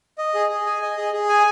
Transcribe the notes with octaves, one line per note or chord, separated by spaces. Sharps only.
D#5
G#4
G#4
G#5
D#5
G#4
G#4
G#5